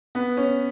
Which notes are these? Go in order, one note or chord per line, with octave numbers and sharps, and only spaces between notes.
B3
C#4